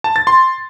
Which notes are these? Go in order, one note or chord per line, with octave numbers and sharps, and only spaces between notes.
A5
A6
C6